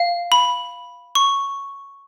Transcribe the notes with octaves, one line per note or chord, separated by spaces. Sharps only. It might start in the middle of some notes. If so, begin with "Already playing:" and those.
Already playing: F5
B5
C#6